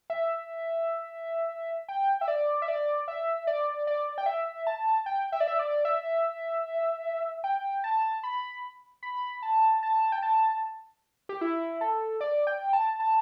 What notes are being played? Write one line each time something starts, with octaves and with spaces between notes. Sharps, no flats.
E5
G5
E5
D5
E5
D5
E5
D5
D5
G5
E5
A5
G5
E5
D5
E5
D5
E5
G5
A5
B5
B5
A5
A5
G5
A5
G4
E4
A4
D5
G5
A5
A5